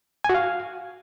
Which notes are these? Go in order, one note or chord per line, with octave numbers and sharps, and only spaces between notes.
G#5
F#4
F5